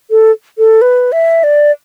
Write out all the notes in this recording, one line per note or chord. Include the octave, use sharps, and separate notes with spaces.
A4
A4
B4
E5
D5